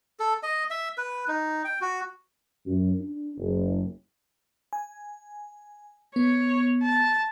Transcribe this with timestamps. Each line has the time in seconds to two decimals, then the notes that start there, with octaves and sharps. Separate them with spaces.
0.20 A4
0.43 D#5
0.70 E5
0.98 B4
1.28 D#4
1.64 G5
1.81 F#4
2.66 F#2
3.00 D4
3.37 F#1
4.73 G#5
6.16 B3 C#5
6.83 A5